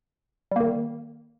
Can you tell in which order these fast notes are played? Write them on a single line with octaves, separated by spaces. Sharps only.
G3 A#3 D#3